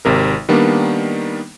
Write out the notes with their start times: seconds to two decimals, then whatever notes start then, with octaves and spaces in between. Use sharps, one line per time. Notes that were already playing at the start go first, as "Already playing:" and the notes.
0.05 G#1 C3 A#4
0.49 D#3 G3 A#3 B3 D4